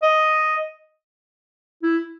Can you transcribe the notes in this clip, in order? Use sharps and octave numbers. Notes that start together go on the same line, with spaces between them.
D#5
E4